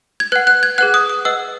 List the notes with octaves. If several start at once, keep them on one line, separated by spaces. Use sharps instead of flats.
G#6
B4 F#5 F#6
F#6
G#6
G#4 B4 F#5 F#6
D#6
D#6
B4 D#5 F#5 E6